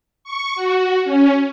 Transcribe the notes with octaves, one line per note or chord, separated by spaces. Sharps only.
C#6
F#4
C#4